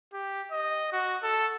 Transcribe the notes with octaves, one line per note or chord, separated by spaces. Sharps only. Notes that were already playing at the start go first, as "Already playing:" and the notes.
G4
D#5
F#4
A4